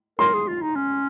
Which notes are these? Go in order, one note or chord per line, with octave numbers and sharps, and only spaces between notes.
A#4 C6
G#4
F4
D#4
C#4